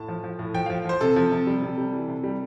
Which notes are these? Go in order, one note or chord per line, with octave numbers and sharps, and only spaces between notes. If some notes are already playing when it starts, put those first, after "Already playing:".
Already playing: A2 A5
F3
F3
A2
F3 G5
F3 F5
F3 C5
C3 A4
F3
C3
G3
C3
G3
E3
C3
G3